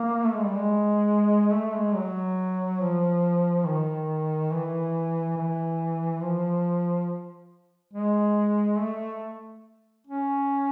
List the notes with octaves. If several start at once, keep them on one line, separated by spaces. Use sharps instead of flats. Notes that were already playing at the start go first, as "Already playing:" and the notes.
Already playing: A#3
A3
G#3
G3
G#3
A3
G#3
F#3
F3
D#3
E3
E3
F3
G#3
A3
C#4